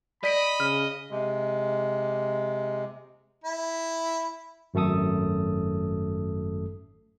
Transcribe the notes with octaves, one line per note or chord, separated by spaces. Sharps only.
D5 D#5 B5 B6 D7
C#3 F6
C3 G#3
E4
G#1 F#2 A3 A4 D#6